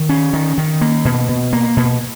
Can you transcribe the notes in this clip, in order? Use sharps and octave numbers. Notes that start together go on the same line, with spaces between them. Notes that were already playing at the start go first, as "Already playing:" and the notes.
Already playing: D#3
C#4
D#3
D#3
A#3
B2
B2
A#3
B2